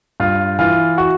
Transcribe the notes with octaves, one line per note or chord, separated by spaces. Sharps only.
G2 F4
E3 F4
F#4